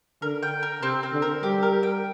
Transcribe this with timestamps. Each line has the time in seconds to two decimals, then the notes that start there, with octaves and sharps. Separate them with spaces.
0.22 D3 A#4
0.43 G5
0.63 A#4
0.82 C3 C4
1.03 C4
1.13 D3
1.22 A#4
1.43 G3 G4
1.63 A#4
1.83 G5